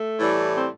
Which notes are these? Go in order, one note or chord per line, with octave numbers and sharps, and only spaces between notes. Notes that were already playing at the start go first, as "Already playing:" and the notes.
Already playing: A3
A2 E3 G3
C4